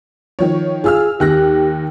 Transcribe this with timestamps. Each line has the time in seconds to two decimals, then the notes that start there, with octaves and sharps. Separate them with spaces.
0.39 D#3 F3 C#5
0.84 F4 G#4 E6 F6
1.20 D#2 G4 F#6 A#6